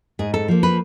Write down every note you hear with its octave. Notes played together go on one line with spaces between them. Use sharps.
G#2 G#4
A4
F3 A#3
B4